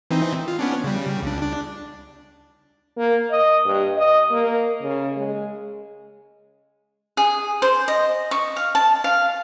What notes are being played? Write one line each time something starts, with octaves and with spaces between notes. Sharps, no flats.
E3 C4 D#4
F4
B3 C#4 D4
C#3 G3
C#2 D4
D4
A#3
D#5
G2
D#5
A#3
C#3
G#3
G#4
C5
D#5
C#6
F5
A5
F5